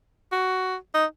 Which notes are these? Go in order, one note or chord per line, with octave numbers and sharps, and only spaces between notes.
F#4
D#4